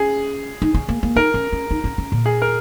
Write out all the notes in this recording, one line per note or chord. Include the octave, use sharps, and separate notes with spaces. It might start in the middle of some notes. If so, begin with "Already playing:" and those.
Already playing: C#4 G#4
D#4
C#4
A#3
A#3
D#4 A#4
C#4
C#4
D#4
C#4
C#4
A#2
G#4
A#4